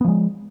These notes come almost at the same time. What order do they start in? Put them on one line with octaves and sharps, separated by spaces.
B3 F3 G#3